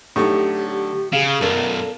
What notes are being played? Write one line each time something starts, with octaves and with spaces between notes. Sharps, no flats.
A2 D3 F#3 D#4 G4
C#3 G#4 F5
B1 F#2 A4 A#4 D5